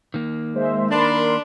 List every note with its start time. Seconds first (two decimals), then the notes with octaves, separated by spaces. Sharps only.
0.14 D#3 A#3
0.54 G#3 C5 E5
0.91 D4 A#4 B5 C6